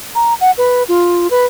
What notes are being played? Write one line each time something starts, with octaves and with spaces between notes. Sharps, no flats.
A#5
F#5
B4
F4
B4